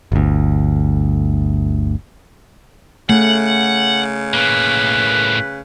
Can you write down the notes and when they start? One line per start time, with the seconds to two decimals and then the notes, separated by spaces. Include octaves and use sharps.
0.12 G1 D2
3.09 C#3 A3 F#5
4.34 A2 A#3 B4